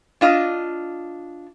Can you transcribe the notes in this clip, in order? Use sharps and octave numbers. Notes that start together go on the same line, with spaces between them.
D4 F4 D#5